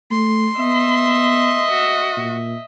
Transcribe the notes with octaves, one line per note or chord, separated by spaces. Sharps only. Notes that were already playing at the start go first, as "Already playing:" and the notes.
A3 C6
B3 D#5 E5
F#4
A#2